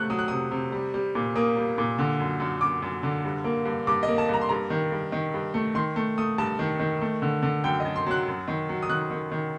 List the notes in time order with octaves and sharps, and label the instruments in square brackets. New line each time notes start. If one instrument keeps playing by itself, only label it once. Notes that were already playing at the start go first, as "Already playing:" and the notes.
Already playing: [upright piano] C3 A3 F#6
F#3 D#6
F#6
C3 D#6
C3
G3
G3
A#2
A#3 D#6
G3
A#2
D3
F#2
F#2
F#2 D6
F#2
D3
G2
A#3
G2
G2 D6
D#5
A#3
A5
G2 A#5
C6
G2 A#5
D#3
G2
D#3
G2
A3
D#3 C6
A3
A3 D#6
G2 A5
D#3
D#3
A3
D3
D3
F#2 G5
D#5
F#2
C6
F#3 F#6
F#2
D#3
F#3
D#6
D#3 F#6
D#3
D#3